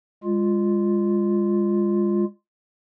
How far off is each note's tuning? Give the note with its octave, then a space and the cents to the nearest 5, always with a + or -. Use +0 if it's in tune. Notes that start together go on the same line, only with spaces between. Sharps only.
G#3 -30 F4 +0